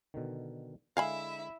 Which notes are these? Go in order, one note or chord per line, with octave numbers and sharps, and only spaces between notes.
B2 D3 D#3
D3 G#3 E4 E5 F5 G#5 B5